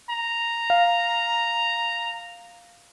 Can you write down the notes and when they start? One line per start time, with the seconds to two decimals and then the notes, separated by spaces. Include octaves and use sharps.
0.10 A#5
0.70 F5